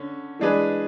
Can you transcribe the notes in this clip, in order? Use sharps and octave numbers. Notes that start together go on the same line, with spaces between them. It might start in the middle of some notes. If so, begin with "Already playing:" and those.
Already playing: D3 C#4
E3 G#3 D4 G#4 B4